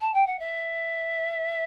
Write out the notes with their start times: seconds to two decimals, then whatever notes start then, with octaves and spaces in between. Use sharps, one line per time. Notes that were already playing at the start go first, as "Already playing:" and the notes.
0.01 A5
0.14 G5
0.26 F#5
0.39 E5